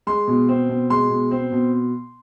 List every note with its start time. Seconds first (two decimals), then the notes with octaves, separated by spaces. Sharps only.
0.07 G#3 C6
0.27 B2
0.48 C4
0.69 B2
0.90 G#3 C6
1.10 B2
1.31 C4
1.52 B2